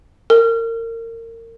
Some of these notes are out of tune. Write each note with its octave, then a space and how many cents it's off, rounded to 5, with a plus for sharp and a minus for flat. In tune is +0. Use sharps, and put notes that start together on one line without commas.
A#4 -30